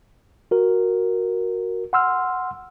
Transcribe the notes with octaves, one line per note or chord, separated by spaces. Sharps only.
F#4 A#4
F#5 C6 E6 F6